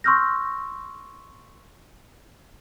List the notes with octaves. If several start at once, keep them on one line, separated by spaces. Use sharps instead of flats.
C6 C#6 E6 F6 G6 A#6